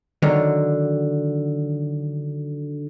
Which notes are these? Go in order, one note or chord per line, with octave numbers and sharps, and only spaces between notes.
D3 D#3 F#3